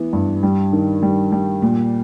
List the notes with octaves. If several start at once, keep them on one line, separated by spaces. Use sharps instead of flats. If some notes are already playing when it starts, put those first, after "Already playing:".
Already playing: E3 B3
G2
G3
D#3
G3
G3
A#2